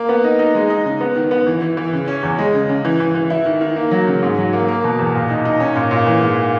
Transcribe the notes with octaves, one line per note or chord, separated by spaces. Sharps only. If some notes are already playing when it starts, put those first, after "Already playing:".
Already playing: A#3
B3
D#4
D#4
G#3
D#4
C#3
B3
D#3
B3
E3
E3
E3
C#3
C#4
E2
G#3
C#3
C#3
E3
E3
E3
E4
D#3
D#3
A#3
F#3
C#3
G#2
F#3
A#3
A#3
B2
E2
A#2
D#4
D#4
C#4
A#2
A#2
E3
G#2